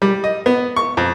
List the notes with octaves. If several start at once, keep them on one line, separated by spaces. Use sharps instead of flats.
G3
D#5
B3
C#6
F2